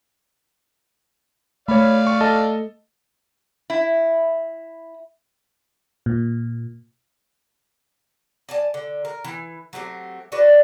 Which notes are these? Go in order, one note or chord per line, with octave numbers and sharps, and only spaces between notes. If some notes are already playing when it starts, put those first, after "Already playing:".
A3 C#5 D5 F5 B5
C#6
A4 D#5 A5
E4
A#2
D5 G#5 A5
D3
A#4
E3
F#3 A3 C4 G4
D4 F#4 B4 D5